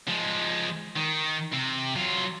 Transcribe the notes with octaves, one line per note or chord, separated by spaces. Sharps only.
F3 G#3
D#3
C3
F#3 F4